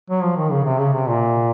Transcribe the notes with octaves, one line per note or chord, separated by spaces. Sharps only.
F#3
F3
D#3
C#3
C3
C#3
C3
A#2